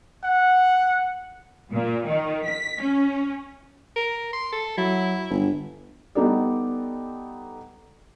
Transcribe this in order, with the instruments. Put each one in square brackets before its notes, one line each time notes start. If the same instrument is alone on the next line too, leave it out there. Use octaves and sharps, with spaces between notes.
[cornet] F#5
[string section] A#2
D#3
B6
C#4
[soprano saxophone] A#4
C6
A4
[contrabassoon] F#3 [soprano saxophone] E4
[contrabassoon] G1
[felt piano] G3 B3 D#4 A4 D5